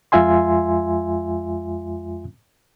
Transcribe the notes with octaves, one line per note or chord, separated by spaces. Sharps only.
F2 G#3 F4 E5 G#5 C6